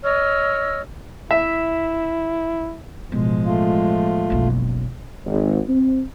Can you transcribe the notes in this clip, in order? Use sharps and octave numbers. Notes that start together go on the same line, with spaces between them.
C#5 D#5 E6 F6
E4 E5
A1 B2 F3 G#3
A3 F4
F#1 B1
G#1
C4